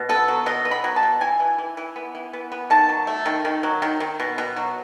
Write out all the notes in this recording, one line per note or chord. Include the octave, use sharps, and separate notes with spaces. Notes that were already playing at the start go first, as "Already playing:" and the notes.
Already playing: B2
B3 A4
F#3
B2 D#5
B3
B5
F#3
A5
B2
E3 G#5
E3
E3
E3
B3
E3
B3
B3
D#3 A5
F#3
A3
D#3
D#3
F#3
D#3
D#3
B2
B2
F#3